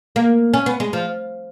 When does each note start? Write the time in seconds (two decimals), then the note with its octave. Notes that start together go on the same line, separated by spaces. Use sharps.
0.16 A#3
0.54 C#4
0.66 B3
0.80 G#3
0.93 F3